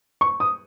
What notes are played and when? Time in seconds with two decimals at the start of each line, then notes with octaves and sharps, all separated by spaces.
0.21 C#6
0.40 D#6